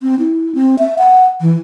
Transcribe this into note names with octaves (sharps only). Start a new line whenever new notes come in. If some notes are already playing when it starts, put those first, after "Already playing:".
C4
E4
C4
E5
F#5
E3